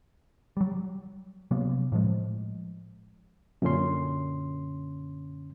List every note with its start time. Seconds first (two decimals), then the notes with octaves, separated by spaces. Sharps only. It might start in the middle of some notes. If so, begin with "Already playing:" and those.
0.57 F#3 G3
1.51 C3 F#3 A#3 B3
1.92 A2 F3 G#3
3.62 F#2 A#2 D3 F#3 C#4 C6